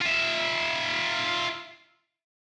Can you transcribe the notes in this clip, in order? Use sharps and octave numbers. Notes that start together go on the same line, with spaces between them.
F4 E5